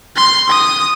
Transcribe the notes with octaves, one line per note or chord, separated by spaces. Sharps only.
C6
D#6